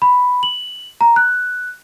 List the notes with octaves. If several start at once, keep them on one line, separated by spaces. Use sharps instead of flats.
B5
F#7
A#5
F#6